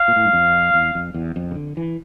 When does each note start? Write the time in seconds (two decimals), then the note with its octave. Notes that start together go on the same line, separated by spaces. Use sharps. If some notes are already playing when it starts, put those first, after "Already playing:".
Already playing: F5
0.08 A#2
0.16 A2
0.25 G2
0.33 F2
0.74 E2
0.95 F2
1.14 E2
1.36 F2
1.51 C#3
1.55 D3
1.77 E3